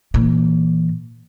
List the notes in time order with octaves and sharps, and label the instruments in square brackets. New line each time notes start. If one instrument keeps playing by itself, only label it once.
[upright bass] A#2 E3